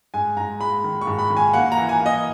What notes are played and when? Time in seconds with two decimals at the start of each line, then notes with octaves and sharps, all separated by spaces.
0.14 G#2 G#5
0.36 G#2 A#5
0.60 G#3 B5
0.84 D#3
1.01 C#6
1.07 G#2
1.19 B5
1.30 D#3
1.37 G#5
1.53 A#3 F#5
1.72 A#5
1.77 E3
1.89 G#5
2.00 A#3
2.06 D#5